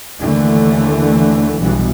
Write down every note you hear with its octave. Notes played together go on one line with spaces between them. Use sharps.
D#2 D3 E3 A3
B1 G2 B2 E3